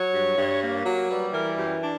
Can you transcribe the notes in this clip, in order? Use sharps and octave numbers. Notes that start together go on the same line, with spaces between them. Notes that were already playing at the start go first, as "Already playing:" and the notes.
Already playing: F#3 C#5
G2
G2
A#3
F#3
G3 B4
E3 A#4
F#2 G4
D4